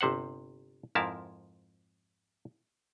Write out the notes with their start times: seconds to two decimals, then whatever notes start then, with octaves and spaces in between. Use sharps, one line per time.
0.01 G1 C3 C5 F#5
0.95 F2 G#2 F3 E4 A#4 A5